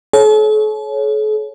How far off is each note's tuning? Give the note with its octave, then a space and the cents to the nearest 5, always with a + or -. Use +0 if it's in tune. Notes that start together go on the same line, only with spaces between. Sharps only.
A4 -45 C#5 +0